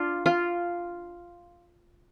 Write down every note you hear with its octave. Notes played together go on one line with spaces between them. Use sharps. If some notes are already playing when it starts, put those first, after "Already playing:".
Already playing: D4 F4
F4